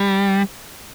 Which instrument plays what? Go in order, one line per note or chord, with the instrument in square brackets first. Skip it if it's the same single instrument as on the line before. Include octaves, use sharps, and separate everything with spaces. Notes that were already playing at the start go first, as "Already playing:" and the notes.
Already playing: [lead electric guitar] G3